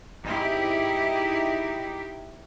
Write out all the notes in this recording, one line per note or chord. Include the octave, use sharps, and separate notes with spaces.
G#1 D#4 E4 G4